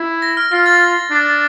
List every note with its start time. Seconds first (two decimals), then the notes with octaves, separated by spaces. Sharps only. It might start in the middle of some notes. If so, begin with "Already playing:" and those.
Already playing: E4
0.22 A#6
0.37 F6
0.52 F4 F6
0.66 A6
1.11 D4